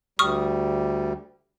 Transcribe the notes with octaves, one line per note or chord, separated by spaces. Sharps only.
D2 G3 C#6 D#6 F6